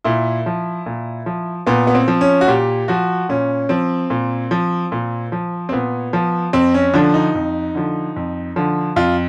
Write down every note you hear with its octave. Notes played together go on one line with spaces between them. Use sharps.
A#2 E4
F3
A#2
F3
A#2 B3
B3
C4
F3
C#4
F#4
A#2 G4
F3 F#4
A#2 C#4
F3 C4
A#2
F3
A#2
F3
C4
A#2 B3
F3
F2 C4
C#4
D3 F3 D4
D#4
F2
D3 F3
F2
D3 F3
F2 F4